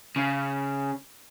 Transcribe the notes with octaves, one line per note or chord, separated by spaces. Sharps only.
C#3